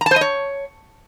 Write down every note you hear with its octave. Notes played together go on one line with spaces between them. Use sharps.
A#5
A5
C5
D#5
C#5